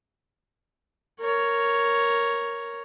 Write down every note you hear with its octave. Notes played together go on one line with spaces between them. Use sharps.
A#4 C#5